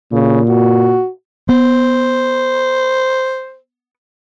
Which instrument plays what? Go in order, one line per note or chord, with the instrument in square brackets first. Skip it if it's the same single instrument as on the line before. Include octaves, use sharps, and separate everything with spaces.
[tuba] A#2 [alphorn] C#3
[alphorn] F#4
[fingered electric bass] B3 [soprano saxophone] C5